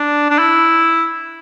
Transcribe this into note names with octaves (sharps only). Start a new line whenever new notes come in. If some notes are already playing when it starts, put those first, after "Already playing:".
Already playing: D4
D4
E4